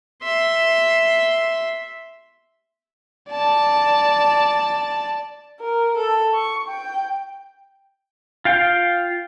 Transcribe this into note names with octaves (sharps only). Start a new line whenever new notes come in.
E5 C6
D5 A5
A#4
A4
C#6
G5
F4 F5 G5